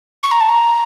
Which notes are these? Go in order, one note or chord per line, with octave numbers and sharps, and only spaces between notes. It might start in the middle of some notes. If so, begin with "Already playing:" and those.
C#6
A#5
A5
A#5